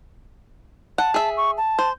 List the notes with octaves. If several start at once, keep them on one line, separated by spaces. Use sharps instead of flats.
F#5 A5
G#4 E5
C#6
A5
C5